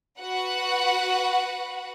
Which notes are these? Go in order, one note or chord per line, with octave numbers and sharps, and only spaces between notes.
F#4 B4 F#5